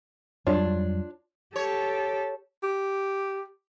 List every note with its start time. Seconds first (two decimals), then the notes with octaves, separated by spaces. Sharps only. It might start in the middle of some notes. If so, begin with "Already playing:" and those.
0.47 F2 F#3 G3 D4 F4 C#5
1.56 G4 A4 C#5
2.63 G4